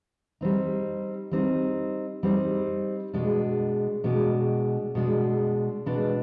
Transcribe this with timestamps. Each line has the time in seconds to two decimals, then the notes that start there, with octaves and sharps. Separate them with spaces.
0.41 G3 C4 D#4
1.31 G3 C4 D#4
2.23 G3 C4 D#4
3.13 B2 G#3 D4
4.04 B2 G#3 D4
4.95 B2 G#3 D4
5.86 B2 G#3 D4